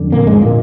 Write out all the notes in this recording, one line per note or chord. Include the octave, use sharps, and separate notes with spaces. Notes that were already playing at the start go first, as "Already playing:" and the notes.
Already playing: F2 D3
A#2 A#3
G#2 G#3
A#2 A#3